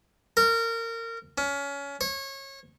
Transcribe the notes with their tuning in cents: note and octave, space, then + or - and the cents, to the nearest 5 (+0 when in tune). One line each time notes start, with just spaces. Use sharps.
A#4 -25
C#4 +25
C#5 -25